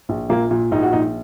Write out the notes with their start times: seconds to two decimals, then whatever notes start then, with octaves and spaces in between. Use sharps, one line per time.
0.09 A#1
0.29 A#2 A#3
0.51 A#2
0.71 A#1 D#4
0.83 F#4
0.93 A#1 D#4